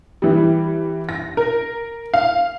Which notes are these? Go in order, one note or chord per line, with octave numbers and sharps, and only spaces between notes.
E3 G3
A#6
A#4
F5